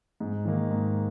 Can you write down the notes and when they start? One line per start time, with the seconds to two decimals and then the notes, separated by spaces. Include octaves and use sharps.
0.20 G#2
0.45 D#3 A#3
0.71 G#2